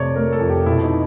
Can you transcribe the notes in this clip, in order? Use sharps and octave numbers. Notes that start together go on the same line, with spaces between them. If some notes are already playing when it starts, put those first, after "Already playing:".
Already playing: F2 C3 A3 C#5 D5
A3 A#4
A4
F2
G4
B2 E4
D#4